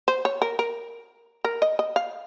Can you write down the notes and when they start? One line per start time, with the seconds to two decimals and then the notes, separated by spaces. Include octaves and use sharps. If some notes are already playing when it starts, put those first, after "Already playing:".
0.08 C5
0.25 C#5
0.42 A#4
0.59 A#4
1.44 A#4
1.62 D#5
1.79 D#5
1.96 F5